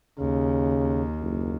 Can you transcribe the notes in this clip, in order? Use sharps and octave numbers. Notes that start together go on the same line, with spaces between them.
D#2 C#3
F#1